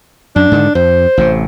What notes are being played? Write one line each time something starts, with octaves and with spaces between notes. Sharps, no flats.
F#2 D4
G#2 D3 D#3
F2 C5
A1 A2 C3